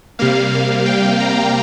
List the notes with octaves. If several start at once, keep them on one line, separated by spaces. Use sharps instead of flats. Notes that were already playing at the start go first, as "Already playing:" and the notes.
C3 G3 A#3 F5
F5
G5
A#5